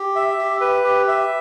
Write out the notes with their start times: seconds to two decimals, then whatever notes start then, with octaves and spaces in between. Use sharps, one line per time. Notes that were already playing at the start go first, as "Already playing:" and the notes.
Already playing: G4
0.16 E5
0.39 G4
0.61 B4
0.84 G4
1.08 E5